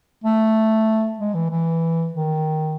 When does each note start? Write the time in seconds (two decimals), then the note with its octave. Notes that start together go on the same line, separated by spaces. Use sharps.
0.24 A3
1.19 G#3
1.34 E3
1.51 E3
2.13 D#3